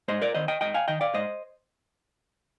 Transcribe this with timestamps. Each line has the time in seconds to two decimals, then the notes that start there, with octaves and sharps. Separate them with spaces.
0.08 G#2 C5 D#5
0.22 A#4 D5
0.35 D#3 C5 D#5
0.48 D#5 G5
0.61 G#2 D#5 G5
0.74 F5 G#5
0.88 D#3 D#5 G5
1.01 D5 F5
1.14 G#2 C5 D#5